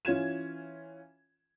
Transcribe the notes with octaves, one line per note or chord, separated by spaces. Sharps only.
E3 C#4 F4 G#6 E7